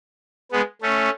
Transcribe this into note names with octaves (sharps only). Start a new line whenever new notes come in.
G#3 B3
A3 C#4